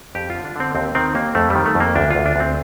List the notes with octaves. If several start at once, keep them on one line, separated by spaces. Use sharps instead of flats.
F2 G4
F4
D3
D4
D3 C4
D#2 C4
D#3 C4
D#2 A#3
F2 A3
D#3 G3
A3
F2
A#3
D2 D4
D2 F4
D4
D2 C4